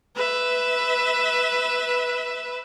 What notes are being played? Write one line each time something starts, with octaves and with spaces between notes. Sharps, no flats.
B4 E5